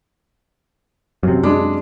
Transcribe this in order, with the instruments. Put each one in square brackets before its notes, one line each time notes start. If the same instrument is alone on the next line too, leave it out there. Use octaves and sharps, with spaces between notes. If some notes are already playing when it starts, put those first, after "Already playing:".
[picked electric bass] F#2 C3
[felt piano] G#3 D4